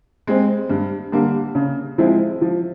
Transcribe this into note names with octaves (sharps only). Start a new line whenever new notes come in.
G#3 C4
G2
D3 G3 A#3
C#3
F3 G#3 C4 E4
F3